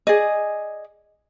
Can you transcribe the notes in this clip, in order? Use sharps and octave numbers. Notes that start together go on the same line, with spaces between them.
G#4 D5 D#5